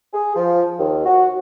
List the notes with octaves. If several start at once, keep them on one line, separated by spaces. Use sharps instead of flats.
G#4
F3
D#2
F#4